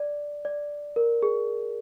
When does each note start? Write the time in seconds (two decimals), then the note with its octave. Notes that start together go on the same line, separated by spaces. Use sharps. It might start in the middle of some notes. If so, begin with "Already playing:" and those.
Already playing: D5
0.45 D5
0.96 A#4
1.23 G#4